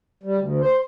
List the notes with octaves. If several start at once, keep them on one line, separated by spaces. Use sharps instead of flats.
G3
D2
C5